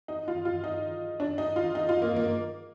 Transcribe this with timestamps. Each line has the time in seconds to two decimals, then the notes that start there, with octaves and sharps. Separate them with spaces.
0.08 D#4
0.28 F4
0.45 F4
0.64 D#4
1.20 D4
1.38 D#4
1.56 F4
1.75 D#4
1.89 F4
2.02 A#3
2.16 A#3